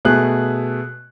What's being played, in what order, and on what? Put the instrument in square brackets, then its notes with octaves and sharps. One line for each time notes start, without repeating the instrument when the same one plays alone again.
[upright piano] B2 A3 G#4 F#6